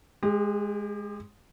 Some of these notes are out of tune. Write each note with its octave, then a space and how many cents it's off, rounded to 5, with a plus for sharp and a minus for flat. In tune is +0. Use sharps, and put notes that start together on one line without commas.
G#3 +0 G4 +40